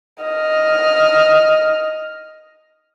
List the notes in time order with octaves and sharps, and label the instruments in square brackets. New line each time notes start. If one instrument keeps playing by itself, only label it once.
[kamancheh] D#5 F6